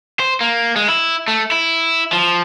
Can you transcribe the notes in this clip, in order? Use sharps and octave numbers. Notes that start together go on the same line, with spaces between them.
C5
A#3
G#3
E4
A3
E4
F3